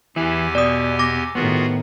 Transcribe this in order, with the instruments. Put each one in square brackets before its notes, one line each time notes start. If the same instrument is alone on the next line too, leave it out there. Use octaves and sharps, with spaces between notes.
[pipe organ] E2 G4 G#5 [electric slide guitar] E3 E4
[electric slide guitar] B2 [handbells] D5 D#6
[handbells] D6 A#6
[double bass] A2 D#3 [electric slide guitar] B3 [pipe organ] F4 F#4 G#4